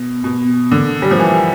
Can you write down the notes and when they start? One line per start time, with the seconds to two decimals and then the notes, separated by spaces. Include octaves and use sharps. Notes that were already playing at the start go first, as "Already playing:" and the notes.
Already playing: B2
0.24 B2
0.71 D3
1.02 G3
1.11 F3
1.19 E3